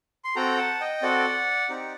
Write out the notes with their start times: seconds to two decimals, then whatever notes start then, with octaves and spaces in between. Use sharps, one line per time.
0.25 C6
0.36 C4 F#4 A4 G5 A#5
0.58 F#5 A5
0.80 D#5 G5
1.02 C4 F#4 A4 D5 F#5
1.70 C4 D#4 G4